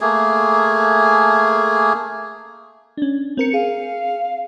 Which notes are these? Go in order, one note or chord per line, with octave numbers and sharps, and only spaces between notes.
A3 A#3 G#4
C#4 D4
C4 A#4 C#7
G#4 F5